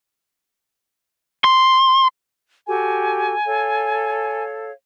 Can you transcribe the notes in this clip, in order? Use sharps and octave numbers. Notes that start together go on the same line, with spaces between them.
C6
F#4 G4 A4 G#5
A4 C#5 F5